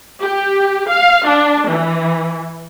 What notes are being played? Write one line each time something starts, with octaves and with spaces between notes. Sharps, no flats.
G4
F5
D4
E3